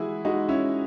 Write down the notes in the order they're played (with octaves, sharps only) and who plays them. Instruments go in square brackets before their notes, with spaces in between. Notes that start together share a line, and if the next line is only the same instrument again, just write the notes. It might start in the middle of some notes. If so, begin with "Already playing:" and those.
Already playing: [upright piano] E3 G#3 E4 F#4 G#4
G#3 D#4 F#4
C#4 E4